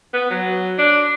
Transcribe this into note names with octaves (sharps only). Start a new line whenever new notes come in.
B3
F#3
D4